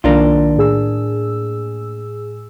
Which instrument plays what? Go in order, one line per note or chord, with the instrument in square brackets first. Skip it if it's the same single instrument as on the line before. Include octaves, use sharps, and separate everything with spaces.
[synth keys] B1 D#3 [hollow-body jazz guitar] A#3 D4 F4
[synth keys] A2 G#4 E6